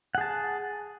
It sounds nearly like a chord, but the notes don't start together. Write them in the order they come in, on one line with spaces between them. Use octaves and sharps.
F#5 G#4 A5